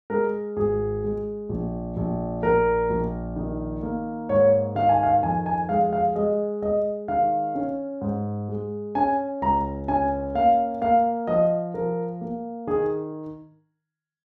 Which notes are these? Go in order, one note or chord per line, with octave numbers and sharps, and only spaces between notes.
G#3 A#4
G#1 G#4
G#3
A#1
A#1
A#1 A#4
A#1
D#3
A#3
G#2 C#5
D#3 F5
G#5
F5
F2 G#5
G#5
G#3 F5
F5
G#3 D#5
G#3 D#5
D#3 F5
C#4
G#2
G#3
C#4 G#5
C#2 A#5
C#4 G#5
A#3 F5
A#3 F5
F3 D#5
F3 A#4
A#3
D#3 G#4